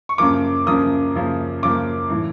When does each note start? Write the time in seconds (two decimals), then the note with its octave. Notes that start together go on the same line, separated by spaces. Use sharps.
0.09 C#6
0.18 F#2 C#3 F3 A#3 D6
0.66 F#2 C#3 F3 A#3 D#6
1.15 F#2 C#3 F3 A#3
1.63 F#2 C#3 F3 A#3 D6
2.10 A2 E3